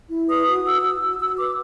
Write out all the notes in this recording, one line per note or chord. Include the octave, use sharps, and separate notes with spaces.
E4
B4 D#6
F#4
F#4 E6
F#4
F#4 E6
F#4 E6
B4 D6